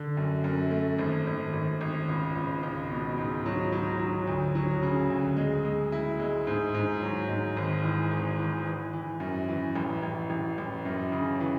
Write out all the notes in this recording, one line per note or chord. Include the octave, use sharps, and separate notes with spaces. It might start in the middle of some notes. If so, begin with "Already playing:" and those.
Already playing: D3
F#2
F#2
A3
G#1
G#1
G#1
G#1
C#2
C#2
C#2
B2
G#2
F#3
F#3
F#3
D2
F#3
C#3
D2
G#3
G#3
E4
G#3
G#2
G#2
F#3
G#2
G#1
E3
G#1
E3
E3
E3
F#2
E3
A1
A1
A1
A1
F#2
C#3
E3